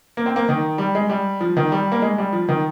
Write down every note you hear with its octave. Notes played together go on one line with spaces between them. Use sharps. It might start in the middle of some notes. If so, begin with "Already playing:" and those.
A#3
C4
A#3
D#3
G3
G#3
G3
F3
D#3
G3
A#3
G#3
G3
F3
D#3